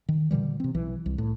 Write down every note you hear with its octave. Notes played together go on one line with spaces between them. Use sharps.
D#3
A#2 D3 E3 G3
C3 C4
B1 E3
C2
A2